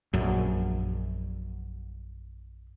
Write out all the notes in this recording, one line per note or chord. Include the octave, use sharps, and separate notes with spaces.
A#1 F#2